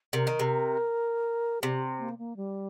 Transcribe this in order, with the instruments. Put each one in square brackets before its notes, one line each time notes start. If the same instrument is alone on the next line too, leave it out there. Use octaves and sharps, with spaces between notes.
[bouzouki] C3 [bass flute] A#4
[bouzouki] D#3
C3
[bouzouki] C3 [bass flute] G4
[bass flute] A#3
A#3
G3